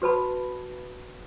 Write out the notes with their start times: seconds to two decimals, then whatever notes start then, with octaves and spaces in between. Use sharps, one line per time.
0.02 F#4 B4 A5 B5